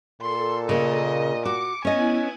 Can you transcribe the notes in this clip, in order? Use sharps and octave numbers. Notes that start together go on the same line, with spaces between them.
A#2 A4 C6
C#3 A#3 D#5
F#4 D6 C#7
B3 C#4 E4 D#5 G#5